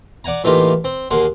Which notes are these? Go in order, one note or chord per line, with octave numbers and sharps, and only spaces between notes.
D5 F#5 G#5 A#5
A2 E3 A#3 D#4 F4 G4
C4
D#2 A#3 G#4 F#5 C6